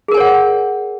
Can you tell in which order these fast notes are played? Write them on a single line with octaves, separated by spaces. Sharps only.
G#4 A#4 G#5 C#5 F#5